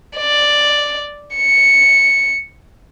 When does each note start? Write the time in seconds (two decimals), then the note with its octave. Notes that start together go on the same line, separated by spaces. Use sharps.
0.17 D5
1.36 C#7